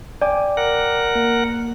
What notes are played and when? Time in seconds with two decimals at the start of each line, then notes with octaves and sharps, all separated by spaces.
0.21 D5 G5 G#5 D6
0.57 A#4 F#5
1.15 A#3